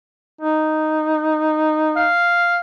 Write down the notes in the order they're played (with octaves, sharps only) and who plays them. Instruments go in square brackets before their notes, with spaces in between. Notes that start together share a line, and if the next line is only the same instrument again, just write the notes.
[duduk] D#4
[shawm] F5